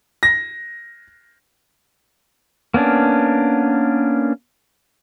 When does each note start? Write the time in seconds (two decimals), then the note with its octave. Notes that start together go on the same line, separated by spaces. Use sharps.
0.23 A#6
2.74 A#3 B3 C#4 D4